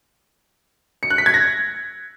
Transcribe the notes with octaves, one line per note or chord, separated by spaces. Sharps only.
C#7
F#6
B6
G#6
A#6